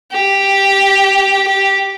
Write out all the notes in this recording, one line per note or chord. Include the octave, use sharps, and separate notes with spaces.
G4
G4